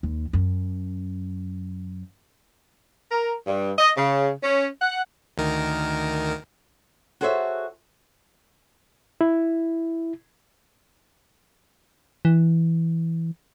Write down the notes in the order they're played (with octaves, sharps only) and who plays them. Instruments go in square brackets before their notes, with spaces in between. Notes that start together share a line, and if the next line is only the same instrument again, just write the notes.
[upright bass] D#2
F#2
[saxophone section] A#4
G2
D#5
C#3
C#4
F#5
[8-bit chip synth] D2 D#3 A#4
[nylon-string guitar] F#4 G#4 A4 C5 C#5 E5
[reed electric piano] E4
[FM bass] E3